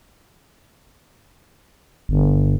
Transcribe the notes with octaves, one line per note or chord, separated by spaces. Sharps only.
G1